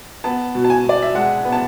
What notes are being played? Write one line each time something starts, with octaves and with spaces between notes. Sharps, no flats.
B3 A5
B2
A5
G#5
B2 D5
E5
G#3 F#5
B3
A5